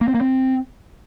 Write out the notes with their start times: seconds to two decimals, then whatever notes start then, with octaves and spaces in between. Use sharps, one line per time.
0.01 A#3
0.08 C4
0.14 A#3
0.21 C4